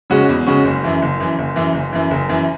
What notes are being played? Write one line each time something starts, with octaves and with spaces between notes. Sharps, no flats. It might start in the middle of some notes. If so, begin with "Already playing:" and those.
C#3 G#3 C#4 F#4
E2
C#3 G#3 C#4 F#4
F#1
F#2 E3
F#1
F#2 E3
F#1
F#2 E3
F#1
F#2 E3
F#1
F#2 E3